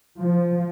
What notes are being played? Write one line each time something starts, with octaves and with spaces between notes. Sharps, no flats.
F3